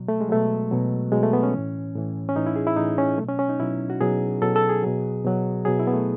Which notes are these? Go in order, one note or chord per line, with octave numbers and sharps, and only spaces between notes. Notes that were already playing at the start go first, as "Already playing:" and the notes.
Already playing: B2 F#3
A3
G#3
B2 F#3 A3
B2 F#3
B2 F#3 G#3
A3
B3
C#4
E3
A2
A2 E3
C#4
A2 E3 D#4
E4
G#4
E4
A2 E3 D#4
C#4
B2 F#3 A3
C#4
C#4
D#4
B2 F#3 E4
F#4
B2 F#3 G#4
B2 F#3 A4
A4
G#4
B2 F#3
B2 F#3
B2 F#3 G#4
E4
B3
A3